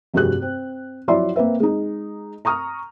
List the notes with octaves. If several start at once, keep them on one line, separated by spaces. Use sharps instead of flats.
F1 G2 C3 F#4 G#4 F#6
C4
F3 F#3 E4 D5 E5 C6
A#3 C4 B4 E5
G#3 D#4
A#5 C#6 D#6 F6